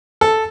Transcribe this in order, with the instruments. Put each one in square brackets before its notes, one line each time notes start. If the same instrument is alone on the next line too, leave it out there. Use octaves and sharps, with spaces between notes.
[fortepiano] A4